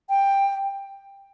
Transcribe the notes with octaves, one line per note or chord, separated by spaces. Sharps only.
G5